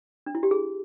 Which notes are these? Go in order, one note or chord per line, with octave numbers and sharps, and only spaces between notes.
D4
E4
G4
G#4